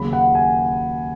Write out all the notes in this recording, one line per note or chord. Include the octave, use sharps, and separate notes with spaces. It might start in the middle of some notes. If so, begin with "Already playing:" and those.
Already playing: D#2 C#3 F#3 B5
F#5
G#5